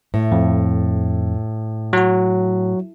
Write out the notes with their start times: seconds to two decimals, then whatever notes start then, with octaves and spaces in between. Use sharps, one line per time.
0.14 A2
0.32 F2
1.93 F#3 F#4